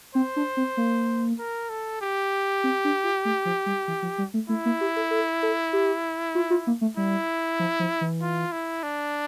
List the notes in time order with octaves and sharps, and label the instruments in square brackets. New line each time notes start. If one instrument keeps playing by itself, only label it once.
[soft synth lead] C4 [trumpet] C5
[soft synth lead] D4
C4
A#3
[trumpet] A#4
A4
G4
[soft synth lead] C4
D4
F4
A3
F3
G3
E3
F3
G3
A3
[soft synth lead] A3 [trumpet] E4
[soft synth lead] A#3
G4
A4
A4
A4
G4
F4
F4
A#3
A3
[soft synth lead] G3 [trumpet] E4
[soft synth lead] F3
F3
E3
[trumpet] F4
E4
D4